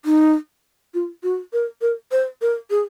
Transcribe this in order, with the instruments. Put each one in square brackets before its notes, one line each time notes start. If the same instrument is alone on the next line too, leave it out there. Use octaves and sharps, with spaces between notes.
[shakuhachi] D#4
F4
F#4
A#4
A#4
C5
A#4
G#4